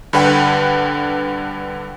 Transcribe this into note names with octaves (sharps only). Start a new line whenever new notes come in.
G2 D3 B4 F#5 G5